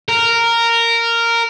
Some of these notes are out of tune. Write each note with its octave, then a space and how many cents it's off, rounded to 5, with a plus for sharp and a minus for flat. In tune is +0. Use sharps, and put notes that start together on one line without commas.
A#4 -10